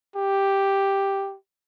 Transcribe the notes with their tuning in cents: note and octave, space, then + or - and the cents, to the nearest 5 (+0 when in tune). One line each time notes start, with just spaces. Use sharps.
G4 +0